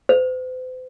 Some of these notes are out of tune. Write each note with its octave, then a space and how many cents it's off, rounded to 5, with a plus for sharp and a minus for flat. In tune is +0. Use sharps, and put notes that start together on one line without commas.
C5 -45